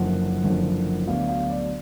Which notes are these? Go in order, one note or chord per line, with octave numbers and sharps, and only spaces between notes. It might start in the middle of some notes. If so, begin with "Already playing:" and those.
Already playing: F#1 F#2 D3 F3 F#5
F#1 F#2 D3 F3
D2 D3 F#3 B3 D4 F5
F5
D5